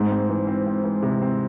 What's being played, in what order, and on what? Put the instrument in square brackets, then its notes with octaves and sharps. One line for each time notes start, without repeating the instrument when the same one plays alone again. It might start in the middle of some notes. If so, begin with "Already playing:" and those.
Already playing: [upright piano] G#2 [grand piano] C4
[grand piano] C4
E3
C4
C4
E3
C3
C4